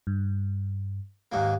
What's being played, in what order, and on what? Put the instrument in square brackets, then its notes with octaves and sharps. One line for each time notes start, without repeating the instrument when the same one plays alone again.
[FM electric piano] G2
[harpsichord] D#2 G#2 A#3